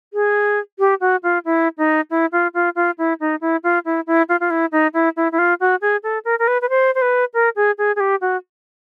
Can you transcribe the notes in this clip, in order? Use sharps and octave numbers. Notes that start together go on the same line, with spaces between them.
G#4
G4
F#4
F4
E4
D#4
E4
F4
F4
F4
E4
D#4
E4
F4
E4
E4
F4
F4
E4
D#4
E4
E4
E4
F4
F#4
G#4
A4
A#4
A#4
B4
B4
C5
C5
B4
A#4
G#4
G#4
G#4
G4
F#4